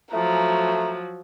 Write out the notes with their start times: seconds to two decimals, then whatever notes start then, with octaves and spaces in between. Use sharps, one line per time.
0.13 F3 F#3 A3 A#5